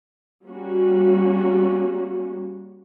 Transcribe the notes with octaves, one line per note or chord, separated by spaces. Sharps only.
G3 A#3 C#4 F#4